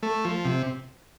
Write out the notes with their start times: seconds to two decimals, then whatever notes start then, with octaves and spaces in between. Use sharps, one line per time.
0.03 A3
0.25 F3
0.45 C3